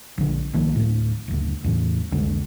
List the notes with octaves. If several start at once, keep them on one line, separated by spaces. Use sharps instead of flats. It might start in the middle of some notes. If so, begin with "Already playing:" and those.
A#1 D3
C2 D#3 F3 A#3
D1 A2
F#1 D2
E2 A2 E3
C2 F2 D3 G#3